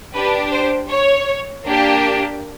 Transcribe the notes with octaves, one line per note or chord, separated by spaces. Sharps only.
D4 G4 B4
C5
C#5
A#3 D4 G4